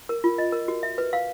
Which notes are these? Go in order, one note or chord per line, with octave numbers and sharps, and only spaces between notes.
A#4
F4
D#5
A#4
F#4
E5
B4
F5